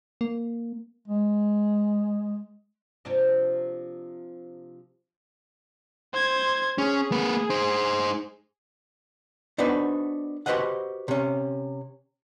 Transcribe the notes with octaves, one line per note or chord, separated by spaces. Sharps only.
A#3
G#3
C3 F3 D4
C5 G#6
C#4 G#4
A#3 B4
D#4 C5
B3 D4 D#4 F#4 B4 C5
F#4 G4 B4 C5 D#5 F#5
C3 C#4